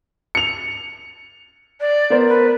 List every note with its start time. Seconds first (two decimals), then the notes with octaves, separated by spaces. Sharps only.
0.35 C#7 F7
1.81 D5
2.10 B3 A#4 C5
2.28 B4